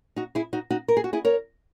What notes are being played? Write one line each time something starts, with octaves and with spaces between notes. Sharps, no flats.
D#4 F#4
E4 G#4
D#4 F#4
D#4 F#4
A#4
G#4
F#4
E4 G#4
A#4 C#5